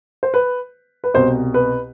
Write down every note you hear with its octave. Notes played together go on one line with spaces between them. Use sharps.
C5
B4
B4
C2 B2 C5
B4